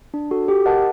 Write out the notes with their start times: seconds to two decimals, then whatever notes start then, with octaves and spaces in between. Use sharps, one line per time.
0.14 D4
0.31 F#4 A4
0.48 G4
0.66 A#4 D#5 F#5 A5